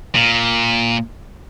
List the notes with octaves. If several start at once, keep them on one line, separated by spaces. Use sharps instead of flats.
A#2